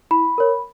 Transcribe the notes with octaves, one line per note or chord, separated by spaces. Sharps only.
E4 B5
A#4 C#5